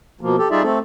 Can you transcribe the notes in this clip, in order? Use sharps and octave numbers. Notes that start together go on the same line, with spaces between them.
B2 F3 A#3
G4 A4
G3 D#4 F4 G#4 D5 E5
A3 C4 A4